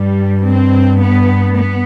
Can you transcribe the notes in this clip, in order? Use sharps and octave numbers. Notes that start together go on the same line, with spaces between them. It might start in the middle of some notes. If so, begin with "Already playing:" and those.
Already playing: G2 G3
C4
B3
B3